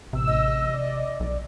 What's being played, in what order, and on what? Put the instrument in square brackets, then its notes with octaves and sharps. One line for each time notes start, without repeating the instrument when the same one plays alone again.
[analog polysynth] A1 E6 [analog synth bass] C3
[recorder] D#5
[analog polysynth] D5
[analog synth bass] B1